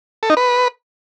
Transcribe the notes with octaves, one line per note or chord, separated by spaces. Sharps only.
A4
D#4
B4